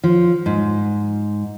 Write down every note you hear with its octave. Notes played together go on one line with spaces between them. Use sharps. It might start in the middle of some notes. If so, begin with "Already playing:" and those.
F3
G#2